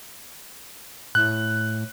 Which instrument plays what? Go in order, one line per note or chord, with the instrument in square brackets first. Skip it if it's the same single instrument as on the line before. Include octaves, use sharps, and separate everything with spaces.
[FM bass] A2 [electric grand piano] F#6